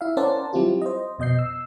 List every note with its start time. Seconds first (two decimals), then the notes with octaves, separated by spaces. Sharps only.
0.01 E4 E5 F5
0.17 C#4 A#4 C5 D5 F#5 A5
0.53 F#3 G3 C4 E4 F4 G4
0.82 C5 D#5
1.19 F2 B2 D#5 G6 C7
1.39 E6